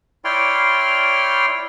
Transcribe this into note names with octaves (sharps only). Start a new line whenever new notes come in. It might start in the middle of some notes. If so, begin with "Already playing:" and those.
E4 C#5 D5 G5 C6 F6